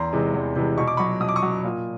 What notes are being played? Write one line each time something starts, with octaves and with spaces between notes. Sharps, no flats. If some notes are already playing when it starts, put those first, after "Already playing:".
Already playing: E2 A#5 C6
C3 E3 G#3
E2
C3 E3 G#3
B2 C#6
D6
F#3 B5 C#6
B2 D#6
D6
C#6 D#6
F#3
A#2